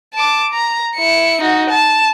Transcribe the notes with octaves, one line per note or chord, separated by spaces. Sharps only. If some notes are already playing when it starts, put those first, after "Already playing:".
A5 D6
A#5
E4 C#7
D#4 F#4
A5